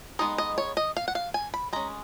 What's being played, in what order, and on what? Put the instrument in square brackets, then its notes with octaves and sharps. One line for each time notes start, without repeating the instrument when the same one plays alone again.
[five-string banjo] G#3 B3 D#4 D#5
D#5
C#5
D#5
F5
F#5
F5
G#5
B5
G#3 C#4 A#5